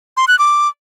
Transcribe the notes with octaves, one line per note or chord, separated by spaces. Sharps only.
C6
F#6
D6